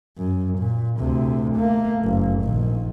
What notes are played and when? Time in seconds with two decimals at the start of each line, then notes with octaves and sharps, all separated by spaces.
0.18 F#2
0.59 A#2
0.99 D2 C3
1.56 A3 A#3
2.04 F#1
2.40 A#1 D#3